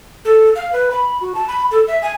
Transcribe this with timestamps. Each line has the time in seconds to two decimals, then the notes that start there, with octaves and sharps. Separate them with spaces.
0.25 A4
0.56 F5
0.73 B4
0.91 B5
1.21 F#4
1.35 A5
1.48 B5
1.71 A4
1.88 E5
2.02 G#5